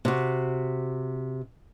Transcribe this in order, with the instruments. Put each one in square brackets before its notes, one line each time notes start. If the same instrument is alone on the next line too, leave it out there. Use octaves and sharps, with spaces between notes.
[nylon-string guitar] C3 F#4